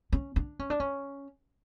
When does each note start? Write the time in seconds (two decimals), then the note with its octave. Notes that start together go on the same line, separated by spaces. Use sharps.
0.12 C#4
0.36 D4
0.59 C#4
0.70 D4
0.80 C#4